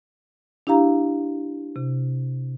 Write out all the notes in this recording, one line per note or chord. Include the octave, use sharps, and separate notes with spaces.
D4 E4 G4 F5 A#5
C3